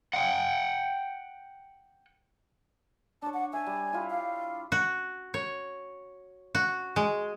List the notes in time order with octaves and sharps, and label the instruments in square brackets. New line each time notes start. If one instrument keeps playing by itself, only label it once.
[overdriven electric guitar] F#5 G5
[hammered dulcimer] D4 C#5 [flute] A5
[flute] F#5
[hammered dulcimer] E5 A5 [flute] G#5
[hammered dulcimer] G3
E4 F4 G4
[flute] F5
[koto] F#4
C#5
F#4
G#3